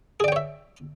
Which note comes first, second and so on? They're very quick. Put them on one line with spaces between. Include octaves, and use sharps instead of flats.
G#4 D5 G5 C#5 E5